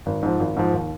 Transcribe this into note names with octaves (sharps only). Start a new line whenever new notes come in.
G#1
G#2 F3
G#1
G#2 F3
D#2